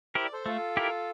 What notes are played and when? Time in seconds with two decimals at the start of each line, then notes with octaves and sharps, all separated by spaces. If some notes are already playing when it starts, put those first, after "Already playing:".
0.15 E4 G4 A#4 C5
0.24 D5
0.33 A4 C5
0.46 A3 F4 A4
0.77 E4 G4 A#4